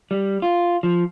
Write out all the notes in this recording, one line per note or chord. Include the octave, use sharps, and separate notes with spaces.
G3
F4
F3